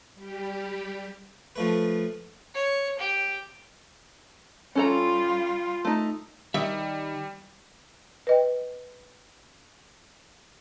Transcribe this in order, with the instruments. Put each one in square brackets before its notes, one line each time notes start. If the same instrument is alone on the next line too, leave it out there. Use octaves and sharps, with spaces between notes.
[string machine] G3 G4
[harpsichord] F3 A3 B4
[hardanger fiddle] C#5
G4
[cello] G3 F4 [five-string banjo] C#4 A4 A#5
[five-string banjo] A3 D#4
[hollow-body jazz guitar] D#3 E5 [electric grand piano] G3
[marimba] B4 D#5 G5